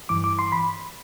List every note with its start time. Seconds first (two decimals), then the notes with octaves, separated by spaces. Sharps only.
0.09 G2 E3 D6
0.24 D6
0.39 C6
0.52 B5